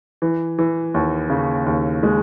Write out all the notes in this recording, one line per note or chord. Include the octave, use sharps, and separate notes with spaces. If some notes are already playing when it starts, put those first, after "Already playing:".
E3
E3
D#2
C#3
D#2
G#3